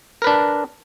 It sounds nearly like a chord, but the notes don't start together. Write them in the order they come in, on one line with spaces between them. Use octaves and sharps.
A#4 B4 D4